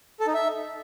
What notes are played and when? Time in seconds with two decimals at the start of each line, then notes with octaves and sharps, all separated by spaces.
0.20 A4
0.27 D#4
0.34 E5